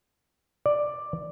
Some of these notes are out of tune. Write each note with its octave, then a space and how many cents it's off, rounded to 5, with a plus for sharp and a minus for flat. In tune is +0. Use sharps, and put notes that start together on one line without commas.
D5 +5